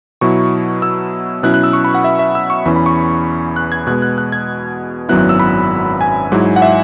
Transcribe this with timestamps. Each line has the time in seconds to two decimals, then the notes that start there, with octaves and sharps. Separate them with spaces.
0.21 B2 F#3 E4 C#6
0.82 E6
1.43 B2 F#3 C#4 E4 F#6
1.54 F#6
1.63 E6
1.73 C#6
1.85 B5
1.95 F#5
2.04 E5
2.19 E5
2.35 E6
2.50 C#6
2.65 E2 E3 C#4 E4 B5
2.76 B5
2.86 C#6
3.56 F#6
3.72 G#6
3.87 B2 G#3 B3 F#6
4.02 F#6
4.18 F#6
4.32 G#6
5.09 G#1 F#2 F#3 B3 E4 F#6
5.19 F#6
5.29 E6
5.40 B5
6.01 G#5
6.32 G#2 F#3 E4
6.56 F#5
6.62 E5